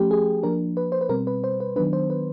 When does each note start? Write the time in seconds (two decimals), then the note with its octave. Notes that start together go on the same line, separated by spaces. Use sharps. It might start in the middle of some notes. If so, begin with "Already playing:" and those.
Already playing: F3 A3 C#4 G4
0.11 G#4
0.43 F3 A#3 D4 A#4
0.77 B4
0.92 C5
1.01 B4
1.09 B2 G3 C4 A#4
1.27 B4
1.44 C5
1.60 B4
1.76 D#3 F#3 B3 D4 B4
1.93 C5
2.10 B4